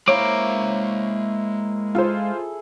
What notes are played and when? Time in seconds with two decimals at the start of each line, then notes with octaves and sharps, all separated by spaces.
0.08 G#3 A#3 E4 A#4 C5 C#5 F5 D6
1.95 F4 G#4 A4 C5